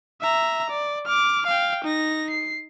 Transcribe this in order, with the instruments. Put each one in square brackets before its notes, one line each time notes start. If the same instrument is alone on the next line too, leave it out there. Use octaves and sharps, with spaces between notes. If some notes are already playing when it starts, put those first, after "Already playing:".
[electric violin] E5 A#5
D5
D6 F6
F5 G5
D#4 A#6
C7